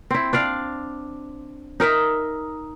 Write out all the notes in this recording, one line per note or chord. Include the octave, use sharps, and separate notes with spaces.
C4 E4
D4 D5 F5
D#4 A#4 D#5 E5